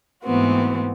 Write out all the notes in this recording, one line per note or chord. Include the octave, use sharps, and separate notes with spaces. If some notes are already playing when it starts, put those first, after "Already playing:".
G#2 E3 A3 B3 C4 F#4